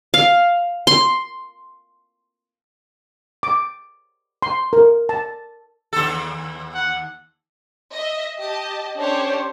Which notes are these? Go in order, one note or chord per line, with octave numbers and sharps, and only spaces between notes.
F5
C6
D6
C6
A#4
A5
D#2 A4
F#5
D#5 E5
G4 D#5 A5
C#4 D4 G4 A4 C5 C#5